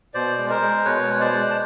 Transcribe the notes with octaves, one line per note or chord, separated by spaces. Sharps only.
B2 C5 D5
G#3
A#4 C5
G#3
B2 B4 C#5
G#3 C#5
C5 D5
G#3
A5